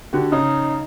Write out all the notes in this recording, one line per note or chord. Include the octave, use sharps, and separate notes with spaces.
D3 F#4 G4
C#3 D#4